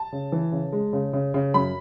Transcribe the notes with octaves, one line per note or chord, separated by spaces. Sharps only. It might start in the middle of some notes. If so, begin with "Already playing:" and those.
Already playing: A5
C#3
E3
C#3
G#3
C#3
C#3
C#3
F#2 B5